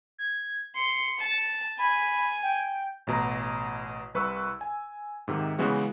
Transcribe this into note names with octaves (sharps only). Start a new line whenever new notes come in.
G#6
C6 C#7
A5
G#5 B5
G5
A1 B2 A#5
C2 B4 C#6 E6
G#5
G#2 C3 D#3
C#3 E3 G#3 B3 F#4